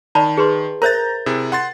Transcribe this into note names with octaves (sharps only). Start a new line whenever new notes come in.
D#3 D5 A5 B5
G#4 B4 C6
A#4 C5 E5 A#5 G6 A6
C3 E4 G#4
F#5 C6 A6